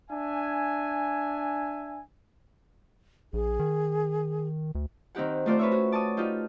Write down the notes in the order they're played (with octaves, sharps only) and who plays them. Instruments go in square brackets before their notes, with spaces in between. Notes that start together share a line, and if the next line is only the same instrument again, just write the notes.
[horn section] D4 E5 G#5
[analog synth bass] A#1 [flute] G#4
[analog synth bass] D#3
D2
[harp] D#3 C4 D#4 G4 F#5
A3 D#4 F4 C5 D5
B4 C#5 E5
C#4 F#4
D5 A5 C#6 D#6
D#4 F4 G4 D#5